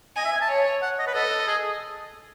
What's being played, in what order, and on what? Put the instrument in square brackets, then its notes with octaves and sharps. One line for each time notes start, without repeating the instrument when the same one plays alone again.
[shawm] D#5 [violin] G#5
[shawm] E5
G#5
A5
[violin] C#5
[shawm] F#5
D#5
B4
[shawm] A4 [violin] D#5
[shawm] G#4